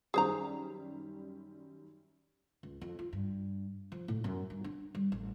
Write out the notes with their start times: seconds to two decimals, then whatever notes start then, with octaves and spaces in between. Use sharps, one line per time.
0.14 F#2 D#3 G3 G#4 C5 A#5
2.63 C#2
2.81 F2
2.99 F4
3.13 G2
3.92 F3
4.08 A2
4.24 F#2
4.50 G2
4.64 D4
4.95 G3
5.12 A1